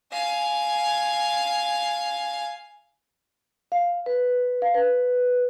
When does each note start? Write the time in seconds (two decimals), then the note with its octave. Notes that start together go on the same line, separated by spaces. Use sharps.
0.12 F5 G#5
3.72 F5
4.06 B4
4.62 F5
4.74 B4